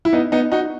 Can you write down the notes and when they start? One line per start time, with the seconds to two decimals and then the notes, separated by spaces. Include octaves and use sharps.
0.05 E4
0.13 B3 D#4
0.32 B3 D#4
0.52 D#4 F#4